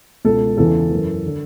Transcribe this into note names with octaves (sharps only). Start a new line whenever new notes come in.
C#2 B2 A4
E2 C#3 E3 A4
F#2 E3
D3